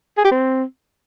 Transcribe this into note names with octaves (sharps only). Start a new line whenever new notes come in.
G#4
G4
C4